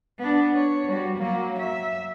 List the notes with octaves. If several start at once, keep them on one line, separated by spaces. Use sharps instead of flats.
B3 D4
C#5
G3 F#4
F#3 A#3
E5